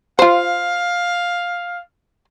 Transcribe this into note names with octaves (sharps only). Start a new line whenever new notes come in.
F4 C5 F5